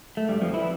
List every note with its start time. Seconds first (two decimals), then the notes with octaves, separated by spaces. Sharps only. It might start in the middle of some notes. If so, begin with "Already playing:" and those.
0.17 A3
0.28 G2 G3
0.41 F2 F3
0.54 E3 E4